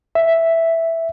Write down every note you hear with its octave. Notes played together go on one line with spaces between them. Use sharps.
E5